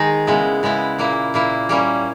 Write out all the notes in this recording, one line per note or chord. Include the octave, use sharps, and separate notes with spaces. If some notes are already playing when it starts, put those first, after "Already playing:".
Already playing: D#3 G#3 D#4 G#4
C#3 G#3 B3 E4
C#3 G#3 B3 E4
A#2 A#3 E4
A#2 A#3 E4
G3 A#3 C#4